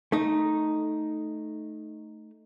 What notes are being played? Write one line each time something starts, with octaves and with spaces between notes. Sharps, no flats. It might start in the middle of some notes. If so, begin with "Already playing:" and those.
A3 D#4